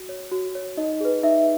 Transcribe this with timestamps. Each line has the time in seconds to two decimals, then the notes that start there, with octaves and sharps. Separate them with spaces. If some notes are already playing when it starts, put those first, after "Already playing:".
Already playing: F#4
0.09 C#5
0.32 F#4
0.55 C#5
0.77 D#4 D#5
1.00 G#4 B4
1.23 D#4 E5